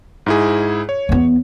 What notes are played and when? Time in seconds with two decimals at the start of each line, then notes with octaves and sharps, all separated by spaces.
0.26 G#2 E4 G#4
0.89 C#5
1.09 E2 B3